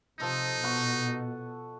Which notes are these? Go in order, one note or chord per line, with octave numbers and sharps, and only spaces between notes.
C3 F3 D#4 A4 D#5
B2 F#5 C#6